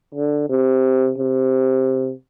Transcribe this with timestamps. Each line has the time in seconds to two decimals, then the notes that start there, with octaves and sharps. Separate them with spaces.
0.15 D3
0.49 C3
1.18 C3